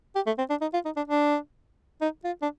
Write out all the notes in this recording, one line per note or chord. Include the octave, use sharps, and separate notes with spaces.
G4
A3
C4
D4
D#4
F4
D#4
D4
D4
D#4
F4
D4